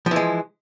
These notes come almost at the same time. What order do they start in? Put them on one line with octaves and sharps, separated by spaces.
F3 E3 G#3